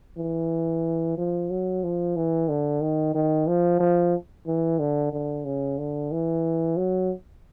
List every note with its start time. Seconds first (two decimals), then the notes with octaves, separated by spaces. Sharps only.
0.18 E3
1.18 F3
1.50 F#3
1.84 F3
2.17 E3
2.49 D3
2.81 D#3
3.15 D#3
3.47 F3
3.80 F3
4.47 E3
4.79 D3
5.13 D3
5.45 C#3
5.79 D3
6.12 E3
6.77 F#3